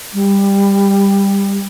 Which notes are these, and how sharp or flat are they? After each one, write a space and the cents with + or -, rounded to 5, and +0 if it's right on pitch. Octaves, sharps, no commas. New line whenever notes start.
G3 +15